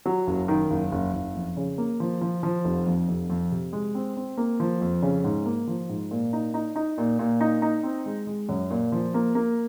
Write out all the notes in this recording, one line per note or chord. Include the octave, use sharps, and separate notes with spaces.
F#3
F#1
D#3
F#1
F#1
F#1
F2
C#3
A#3
F3
F3
F3
F1
F2
F1
F2
C3
G#3
C4
C4
A#3
F3
F2
C#3
G#2
A#3
F3
G#2
A#2
D#4
D#4
D#4
A#2
A#2
D#4
D#4
C4
G#3
G#3
F#2
A#2
F3
A#3
A#3